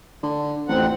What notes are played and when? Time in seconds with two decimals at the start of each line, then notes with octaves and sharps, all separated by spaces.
0.23 D3
0.68 A1 F2 C4 F#5